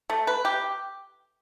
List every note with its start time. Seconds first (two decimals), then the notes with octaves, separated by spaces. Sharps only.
0.10 A3
0.27 B4
0.45 G4